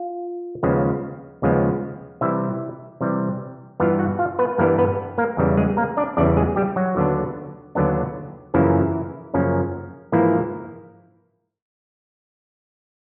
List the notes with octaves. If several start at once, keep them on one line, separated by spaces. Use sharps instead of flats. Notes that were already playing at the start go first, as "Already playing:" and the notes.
Already playing: F4
D#2 C#3 F3 G#3 B3
D#2 C#3 F3 G#3 B3
C3 E3 G3 E4 E5
C3 E3 G3
G2 E3 G3 B3 F4 F5
F#4 F#5
F4 F5
B3 B4
G2 E3 G3 A#3 B3 A#4
B3 B4
A#3 A#4
E2 C#3 E3 G3
G#3 G#4
A#3 A#4
D4 D5
E2 C#3 E3 G3 D4 D5
G#3 G#4
G3 G4
F#3 F#4
D#2 D3 F#3 B3 D4
D#2 D3 F#3 B3 D4
F#2 C#3 E3 F3 A#3 C#4 E4
F#2 C#3 F3 A#3 C#4
G#2 E3 F3 A#3 E4